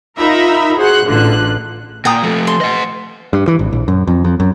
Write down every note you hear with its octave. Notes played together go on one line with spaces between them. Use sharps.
D#4 F4 A#4 E5 A#5 B5
F#4 G#4 C5 F#5 F#6
A1 D3 F4 F#6
A#2 G5 A#5 D#6
F3 A3
C6
D#5 F#5
G2
E3
G#1
A#1
F#2
F2
F2
F#2